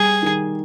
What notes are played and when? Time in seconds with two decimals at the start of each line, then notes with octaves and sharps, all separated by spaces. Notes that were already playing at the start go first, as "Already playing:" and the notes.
Already playing: G3 G#4
0.23 D#3